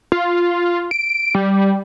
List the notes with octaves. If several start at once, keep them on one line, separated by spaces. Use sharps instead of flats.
F4
D7
G3